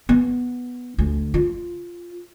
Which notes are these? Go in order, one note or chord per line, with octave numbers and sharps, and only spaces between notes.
B3
D2
F4